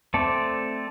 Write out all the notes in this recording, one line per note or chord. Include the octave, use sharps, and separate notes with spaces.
A3 C4 A4 D5